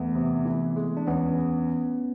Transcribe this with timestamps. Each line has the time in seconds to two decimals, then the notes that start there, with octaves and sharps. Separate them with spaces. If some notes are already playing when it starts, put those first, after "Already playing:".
Already playing: E2 A3 B3
0.15 C3
0.45 E3
0.76 G#3
0.97 D4
1.07 E2 B3 C#4